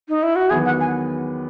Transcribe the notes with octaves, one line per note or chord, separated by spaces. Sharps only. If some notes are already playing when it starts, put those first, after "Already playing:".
D#4
E4
F#4
E2 D#3 F#3 B3 G#4
F#5
G#5